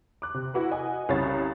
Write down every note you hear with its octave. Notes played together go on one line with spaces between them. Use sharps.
D6 F#6
C3
E4 F#4 B4
D#5 F#5 G#5
C2 C#3 C#5 B5 A6